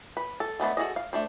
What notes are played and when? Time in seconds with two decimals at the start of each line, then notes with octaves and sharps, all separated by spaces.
0.17 B4
0.40 A4
0.60 G#3 A3 B3 D4
0.77 F#4 G#4 A4 D#5
0.96 F5
1.13 A3 D4 C5